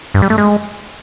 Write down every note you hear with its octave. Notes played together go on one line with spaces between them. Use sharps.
G2
G3
A3
G#3